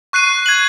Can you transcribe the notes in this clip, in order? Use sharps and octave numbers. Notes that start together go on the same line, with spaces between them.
C#6 F#6 C7 D#7
G#6 D#7 F#7